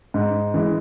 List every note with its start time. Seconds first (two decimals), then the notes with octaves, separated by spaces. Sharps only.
0.14 G#2
0.54 E3 G#3